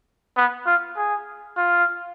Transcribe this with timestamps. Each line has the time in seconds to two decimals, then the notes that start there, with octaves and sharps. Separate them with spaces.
0.37 B3
0.66 F4
0.97 G#4
1.57 F4